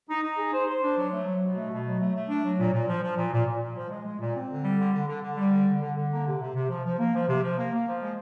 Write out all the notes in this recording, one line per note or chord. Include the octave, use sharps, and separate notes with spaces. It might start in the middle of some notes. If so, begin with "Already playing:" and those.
D#4
D#4
G#4
C5
C5
D4
F#3
A3
F#3
B2
A3
B2
F#3
A3
A3
D4
F#3
A#2
A#2
F3
F3
A#2
A#2
A#2
A#2
F3
G#3
G#3
A#2
C4
D3
G3
D3
D3
D3
D3
G3
D3
D3
D3
D3
A#3
C3
C3
C3
F3
F3
A#3
F3
C3
F3
A#3
A#3
F3
G#3